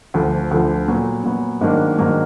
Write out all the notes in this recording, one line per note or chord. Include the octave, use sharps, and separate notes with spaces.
D2 D3 F3
D2 D3 F3
A#2 F#3 B3
A#2 F#3 B3
G#2 D#3 F#3 A#3 D4
G#2 D#3 F#3 A#3 D4